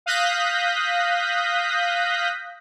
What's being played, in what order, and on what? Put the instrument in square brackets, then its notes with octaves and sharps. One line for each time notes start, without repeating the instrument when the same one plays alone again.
[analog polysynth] F5 D#6 F#6 G6 A#6 B6